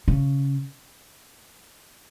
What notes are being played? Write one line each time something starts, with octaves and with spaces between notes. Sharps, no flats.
C#3